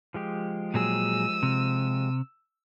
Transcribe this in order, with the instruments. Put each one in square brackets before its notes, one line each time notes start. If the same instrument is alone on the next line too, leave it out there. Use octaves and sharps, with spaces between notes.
[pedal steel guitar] F3 G#3 G4
[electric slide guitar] A#2 F#3 G#4 [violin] E6 D#7
[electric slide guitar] C3